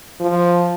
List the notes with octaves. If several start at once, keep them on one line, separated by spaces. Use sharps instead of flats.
F3